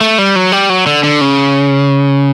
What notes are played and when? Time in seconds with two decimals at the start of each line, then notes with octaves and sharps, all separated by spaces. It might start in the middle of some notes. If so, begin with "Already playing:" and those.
0.01 A3
0.18 G3
0.36 F#3
0.52 G3
0.70 F#3
0.86 D3
1.04 D3
1.21 C#3